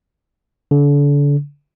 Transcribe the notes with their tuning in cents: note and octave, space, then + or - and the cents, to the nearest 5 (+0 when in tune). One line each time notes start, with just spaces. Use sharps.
D3 -35